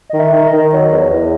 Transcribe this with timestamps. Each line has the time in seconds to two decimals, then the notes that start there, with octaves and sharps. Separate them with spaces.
0.10 D#3 D#5
0.19 E5
0.33 D#3
0.46 D#5
0.52 D#3
0.72 F#3 D#5
0.92 E2
1.12 E2